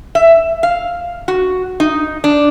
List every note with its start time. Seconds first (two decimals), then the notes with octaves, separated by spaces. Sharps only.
0.15 E5
0.63 F5
1.28 F#4
1.80 D#4
2.24 D4